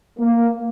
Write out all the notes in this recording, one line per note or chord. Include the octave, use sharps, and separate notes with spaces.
A#3